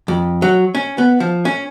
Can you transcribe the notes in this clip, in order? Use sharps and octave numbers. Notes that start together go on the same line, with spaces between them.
F2
F#3
C#4
B3
F3
C#4